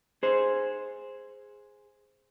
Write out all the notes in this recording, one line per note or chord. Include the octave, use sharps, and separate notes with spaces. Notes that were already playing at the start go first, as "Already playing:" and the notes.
G#4 C5